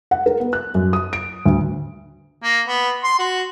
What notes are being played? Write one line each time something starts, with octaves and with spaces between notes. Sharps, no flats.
F#5
A#4
B3
F#6
F#2
D#6
D7
D2
A#3
B3
C6
F#4